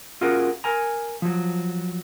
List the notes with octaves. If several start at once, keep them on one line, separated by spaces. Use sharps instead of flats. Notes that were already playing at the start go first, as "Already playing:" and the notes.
C#4 F4 F#4 G#4 A#4
A#4 G#5 A#5
F3 F#3